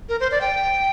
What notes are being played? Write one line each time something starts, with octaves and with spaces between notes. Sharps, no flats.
A#4
C5
D5
G5